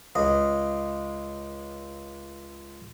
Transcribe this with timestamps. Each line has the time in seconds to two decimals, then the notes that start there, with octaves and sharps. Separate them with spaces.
0.15 C#2 D#5